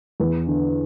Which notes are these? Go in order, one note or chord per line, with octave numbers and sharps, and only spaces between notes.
E2
D3